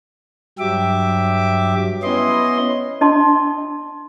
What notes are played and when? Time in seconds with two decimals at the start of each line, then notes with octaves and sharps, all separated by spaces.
0.59 G2 F#3 G4 E5 D6
2.03 B3 C#4 E4 D#5 C6
3.01 D4 D#5 A5 C6